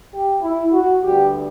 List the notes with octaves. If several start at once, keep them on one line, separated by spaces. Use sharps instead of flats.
G4
E4
F#4
D2 D3 G3 B3 G4